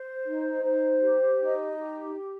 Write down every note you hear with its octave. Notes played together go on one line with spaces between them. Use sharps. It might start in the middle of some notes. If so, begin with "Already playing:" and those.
Already playing: C5
D#4
C5
G4
D#4
G4